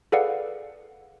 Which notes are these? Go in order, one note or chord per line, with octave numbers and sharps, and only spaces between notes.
G#4 A4 B4 D5 F5 F#5